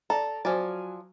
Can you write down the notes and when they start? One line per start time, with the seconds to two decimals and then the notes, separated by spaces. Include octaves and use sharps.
0.10 A4 D5 A#5
0.45 F3 F#3 D5 G#5 F6